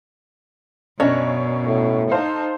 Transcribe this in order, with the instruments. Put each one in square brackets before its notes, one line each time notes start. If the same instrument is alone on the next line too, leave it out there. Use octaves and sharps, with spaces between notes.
[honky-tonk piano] F#2 C#5 [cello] B2 [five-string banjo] C#4 D4 D#5
[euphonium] A2
[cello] D#4 [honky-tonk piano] A4 C5 F5